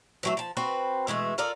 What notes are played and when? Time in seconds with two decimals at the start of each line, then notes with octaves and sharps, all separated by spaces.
0.23 E3 F#3 A3
0.37 F3 A5
0.57 C4 F#4 B4
1.07 B2 E3 G#3 A3
1.38 F4 A4 A#4 D5